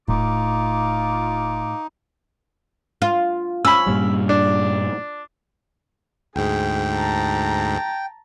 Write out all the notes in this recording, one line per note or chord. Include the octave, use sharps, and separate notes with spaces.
D#1 A2 D#4 F4 D6
F4
C#4 B5 E6
G2 A#2 G3
D4
D2 G#2 G#4 G5
A5 A#5